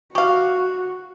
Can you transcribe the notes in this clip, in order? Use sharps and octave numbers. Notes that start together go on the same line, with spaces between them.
F#4 G4 F5 C#6